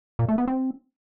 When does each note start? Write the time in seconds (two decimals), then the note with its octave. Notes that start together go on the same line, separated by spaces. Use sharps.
0.19 A#2
0.29 A3
0.38 B3
0.48 C4